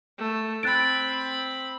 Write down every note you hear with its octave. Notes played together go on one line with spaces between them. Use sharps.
A3
C4 B5 F#6 A6 D7